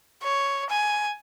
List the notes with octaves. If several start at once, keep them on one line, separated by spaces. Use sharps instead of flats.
C#5
G#5